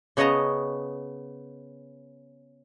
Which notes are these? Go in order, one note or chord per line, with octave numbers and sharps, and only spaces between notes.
C#3 B3 C#5 D#5 A5 A#5